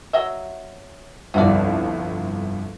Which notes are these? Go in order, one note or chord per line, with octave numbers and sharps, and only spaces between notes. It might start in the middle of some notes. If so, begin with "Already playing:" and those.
F#3 D#5 E5
G1 C2 F2 F4 F#4 D5